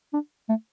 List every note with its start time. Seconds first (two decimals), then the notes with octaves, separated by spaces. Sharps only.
0.14 D4
0.49 A3